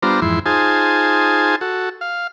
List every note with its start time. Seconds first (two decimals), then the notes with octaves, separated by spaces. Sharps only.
0.02 G3 B3 D4 F4 C5 A#5
0.22 F2 G#2 E3 E4 C6
0.46 D#4 F4 G#4 C5 G#5 A5
1.61 F#4 A4
2.01 F5